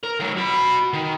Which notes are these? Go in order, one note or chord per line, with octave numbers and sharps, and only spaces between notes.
A#4
D#3 F#3
F#4 B5
D#3